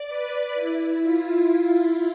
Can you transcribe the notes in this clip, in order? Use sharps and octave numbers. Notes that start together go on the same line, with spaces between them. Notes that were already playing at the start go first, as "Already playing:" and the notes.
Already playing: D5
B4
E4
F4